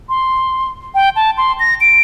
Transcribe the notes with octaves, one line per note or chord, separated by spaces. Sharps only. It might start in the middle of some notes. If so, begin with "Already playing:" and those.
C6
G5
A5
C6
A#6
D7